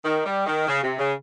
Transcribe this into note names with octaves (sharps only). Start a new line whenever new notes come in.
D#3
G3
D#3
C#3
C3
C#3